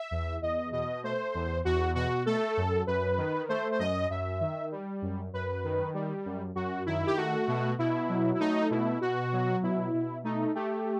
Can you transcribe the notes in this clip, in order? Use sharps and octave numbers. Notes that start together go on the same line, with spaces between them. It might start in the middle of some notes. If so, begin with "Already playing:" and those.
Already playing: E5
E2
E2 D#5
B2 D#5
A3 C5
E2
E2 F#4
B2 F#4
A3 A4
F#2
F#2 B4
D#3
A3 C5
C5
F#2 D#5
F#2 E5
D#3
G3
F#2
F#2 B4
D#3
G3
F#2
F#2 F#4
D#3 E4
G4
A3 F#4
B2
B2 E4
F#3
E4
A3 D#4
B2 E4
B2 F#4
F#3
B2 E4
B2
A3 D#4
A3 G4